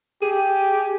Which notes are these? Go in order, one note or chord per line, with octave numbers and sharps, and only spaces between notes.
G4 G#4